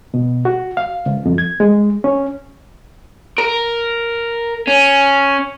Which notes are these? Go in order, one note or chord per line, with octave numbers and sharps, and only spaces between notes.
B2
F#4
F5
C#2
F2
G#6
G#3
C#4
A#4
C#4